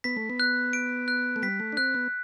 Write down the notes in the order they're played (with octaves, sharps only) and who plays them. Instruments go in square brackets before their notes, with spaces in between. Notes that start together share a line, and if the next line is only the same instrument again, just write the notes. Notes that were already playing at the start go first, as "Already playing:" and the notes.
[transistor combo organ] B3 [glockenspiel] B6
[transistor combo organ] A3
B3
[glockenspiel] F#6
D7
F#6
[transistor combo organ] A3
[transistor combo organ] G3 [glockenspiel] B6
[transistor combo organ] A3
D4
[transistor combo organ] C4 [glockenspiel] F#6
[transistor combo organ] B3